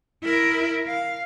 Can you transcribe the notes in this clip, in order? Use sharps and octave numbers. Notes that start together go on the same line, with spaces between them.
E4 A#4
F5